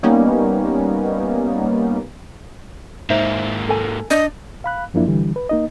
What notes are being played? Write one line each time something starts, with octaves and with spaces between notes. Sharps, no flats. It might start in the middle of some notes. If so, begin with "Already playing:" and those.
G3 A#3 B3 C#4 D#4
G#2 A#3 D#4 C5 E5
A4 G#5
D4 D5 D#5
F5 B5 F#6
F#2 F3 A#3 D4 E4
D3 E3 G3
B4
A#3 D#4 D#5